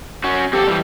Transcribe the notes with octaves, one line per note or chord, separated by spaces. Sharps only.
C#4 F#4
C4 G4 A4
E3 G3